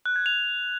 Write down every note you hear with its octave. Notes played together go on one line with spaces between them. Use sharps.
F#6
G#6
F7